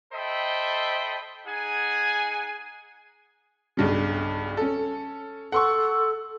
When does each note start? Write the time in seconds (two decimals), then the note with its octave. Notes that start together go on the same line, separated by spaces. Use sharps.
0.13 A4 C5 D#5 E5 G5 B5
1.46 D#4 G#4 F#5 G#5
3.77 B1 G2 C#3
4.57 C#4 A4
5.52 A4 F#5 C6 C#6